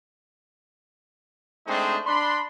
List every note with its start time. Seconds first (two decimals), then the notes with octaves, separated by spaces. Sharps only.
1.67 G#3 A3 C4 D4 D#4 C5
2.06 D4 B5 C6